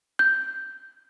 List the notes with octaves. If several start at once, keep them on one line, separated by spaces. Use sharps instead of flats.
G6